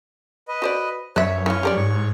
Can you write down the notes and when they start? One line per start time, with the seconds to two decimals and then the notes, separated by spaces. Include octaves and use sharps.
0.48 B4 D#5
0.62 F#4 C5 D5
1.16 F#2 B4 C#5 D5 E5
1.46 D#3 E3 C#4 F4 C#6
1.63 G4 A#4 D5
1.76 G#2 C#5 C#6